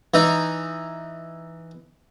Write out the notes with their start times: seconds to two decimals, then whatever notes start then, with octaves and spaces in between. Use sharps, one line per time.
0.14 E3 D#4